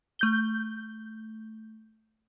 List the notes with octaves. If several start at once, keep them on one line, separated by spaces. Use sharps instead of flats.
A3 G6 G7